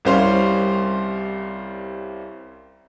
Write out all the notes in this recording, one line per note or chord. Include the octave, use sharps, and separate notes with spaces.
C2 G3 C#4 C5 F5 C6